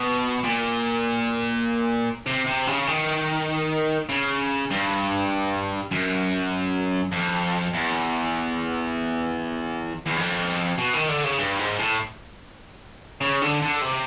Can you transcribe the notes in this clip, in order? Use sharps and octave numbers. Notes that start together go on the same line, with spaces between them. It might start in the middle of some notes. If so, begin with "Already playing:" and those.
Already playing: B2
A#2
C3
C3
C#3
D#3
C#3
G2
F#2
F2
E2
E2
F2
B2
D#3
D3
C#3
G2
G#2
A2
C#3
D3
D3
C3